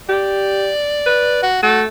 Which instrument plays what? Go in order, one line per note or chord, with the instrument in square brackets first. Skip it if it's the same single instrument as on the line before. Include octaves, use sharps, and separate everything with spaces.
[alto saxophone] G4 [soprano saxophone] D5
[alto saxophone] B4
[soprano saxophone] F#4
[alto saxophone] A3 [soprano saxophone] F#4